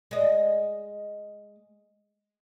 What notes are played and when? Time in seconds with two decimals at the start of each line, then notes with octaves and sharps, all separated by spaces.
0.11 G#3 D#5